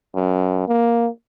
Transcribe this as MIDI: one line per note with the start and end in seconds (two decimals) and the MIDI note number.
0.15 0.63 42
0.68 1.09 58